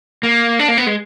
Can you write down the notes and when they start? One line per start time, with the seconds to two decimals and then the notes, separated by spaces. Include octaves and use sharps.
0.23 A#3
0.59 D4
0.68 A#3
0.77 B3
0.87 G#3